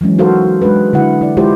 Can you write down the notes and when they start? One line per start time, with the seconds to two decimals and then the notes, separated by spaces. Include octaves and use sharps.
0.01 E3 F#3 G#3 C#4
0.18 D#4 F#4 A4 A#4 C5 F5
0.62 G#3 D4 G#4 B4
0.93 D3 E4 F#5
1.21 E4 D5
1.37 G#3 E4 F4 G4 C5